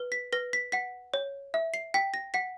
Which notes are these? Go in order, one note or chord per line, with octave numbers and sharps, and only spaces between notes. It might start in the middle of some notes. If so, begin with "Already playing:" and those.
Already playing: B4
B6
B4 A#6
B6
F#5 B6
C#5
E5
C7
G5 B6
A#6
F#5 B6